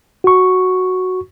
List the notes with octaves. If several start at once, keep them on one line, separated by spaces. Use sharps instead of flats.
F#4 C#6